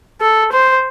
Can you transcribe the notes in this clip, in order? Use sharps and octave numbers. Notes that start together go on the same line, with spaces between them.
A4
C5